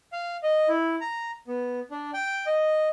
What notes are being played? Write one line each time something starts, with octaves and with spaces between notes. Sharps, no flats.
F5
D#5
E4
A#5
B3
D4
G5
D#5